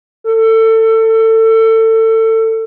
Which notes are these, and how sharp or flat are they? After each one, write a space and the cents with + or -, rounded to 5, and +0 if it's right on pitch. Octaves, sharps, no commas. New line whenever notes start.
A4 +25